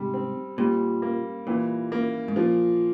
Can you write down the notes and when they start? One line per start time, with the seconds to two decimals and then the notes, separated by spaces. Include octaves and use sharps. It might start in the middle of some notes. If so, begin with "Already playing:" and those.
Already playing: G#2 C3 G3
0.14 C4
0.58 A#2 G3
1.02 A#3
1.47 A#2 E3
1.92 A#3
2.28 G#2
2.36 A#2 F3